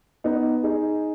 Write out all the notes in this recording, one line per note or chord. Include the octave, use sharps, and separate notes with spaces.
B3 D#4
D#4 G#4